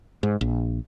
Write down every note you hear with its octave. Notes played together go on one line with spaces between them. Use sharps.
G#2
A#1